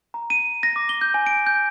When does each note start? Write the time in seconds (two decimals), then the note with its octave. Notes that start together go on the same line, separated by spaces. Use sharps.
0.14 A#5
0.30 D#7
0.63 A#6
0.76 D6
0.89 G7
1.01 G6
1.14 G#5
1.26 D7
1.47 G6